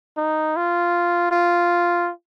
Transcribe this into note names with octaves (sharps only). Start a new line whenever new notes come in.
D#4
F4
F4